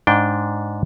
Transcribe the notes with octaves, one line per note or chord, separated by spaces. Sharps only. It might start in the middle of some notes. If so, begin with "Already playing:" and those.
G#2 D4 G5